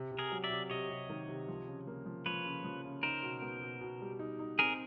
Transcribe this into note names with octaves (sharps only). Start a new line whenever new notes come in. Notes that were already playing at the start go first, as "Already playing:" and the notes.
Already playing: C3
C3
G#4 A#4
F#3
D5 E5
C3
C3 C#5 D#5
C3
D#3
C3
F3
C#3
A#3
F3
F3 B4 C#5
C#3
F3
C#3
D#4 A#4 C5
B2
B3
B2
B2
G3
D#4
D#4
C4 G#4 A#4